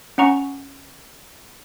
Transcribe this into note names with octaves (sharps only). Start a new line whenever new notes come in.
C#4 F#5 A#5 C#6